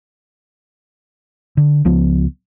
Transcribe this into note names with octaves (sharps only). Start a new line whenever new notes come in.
D3
C#2 F3 B3